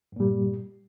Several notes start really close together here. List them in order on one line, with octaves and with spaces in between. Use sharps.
G2 A#2 G3